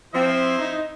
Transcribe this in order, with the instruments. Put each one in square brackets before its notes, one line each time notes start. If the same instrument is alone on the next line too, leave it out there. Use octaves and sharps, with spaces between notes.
[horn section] F3 C4 [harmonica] E4 C5 E5
[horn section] D#4